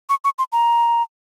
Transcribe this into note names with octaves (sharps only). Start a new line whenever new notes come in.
C#6
C#6
C6
A#5